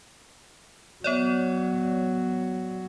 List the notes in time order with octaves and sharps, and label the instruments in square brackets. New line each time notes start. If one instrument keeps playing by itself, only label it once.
[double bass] F#3 [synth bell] B3 C#5 D5